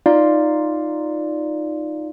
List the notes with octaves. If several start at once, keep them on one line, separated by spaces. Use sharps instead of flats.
D#4 F4 D5 F5